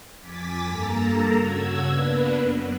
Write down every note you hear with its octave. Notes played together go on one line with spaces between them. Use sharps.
F2 G#5 D6 A6 B6
G2 A#3 A4 A5 A#5
C#3 F#4 E6 G#6
A#3 B3 D4 B4
F#2